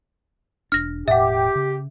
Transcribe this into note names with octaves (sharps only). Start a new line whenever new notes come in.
E1 D4 F6 A#6
E1 A2 G4 E5 F#5
C#3